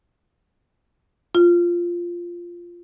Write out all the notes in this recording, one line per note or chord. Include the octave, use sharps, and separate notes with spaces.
F4